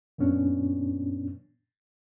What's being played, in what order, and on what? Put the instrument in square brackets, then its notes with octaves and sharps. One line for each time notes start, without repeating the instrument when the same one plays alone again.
[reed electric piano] F#2 A#2 B3 C#4 D4